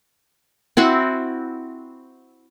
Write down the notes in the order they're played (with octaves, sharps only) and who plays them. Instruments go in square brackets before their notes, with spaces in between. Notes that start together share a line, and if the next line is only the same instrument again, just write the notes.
[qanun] C4 E4 F#4